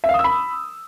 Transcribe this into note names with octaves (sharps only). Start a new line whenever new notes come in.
E5
F5
D#6
E6
B5